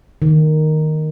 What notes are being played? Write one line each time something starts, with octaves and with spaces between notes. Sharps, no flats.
D#3